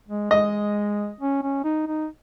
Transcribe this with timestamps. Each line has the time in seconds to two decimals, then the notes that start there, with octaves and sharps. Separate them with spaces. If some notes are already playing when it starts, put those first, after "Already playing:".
0.08 G#3
0.31 G#3 D#5
1.20 C#4
1.43 C#4
1.64 D#4
1.87 D#4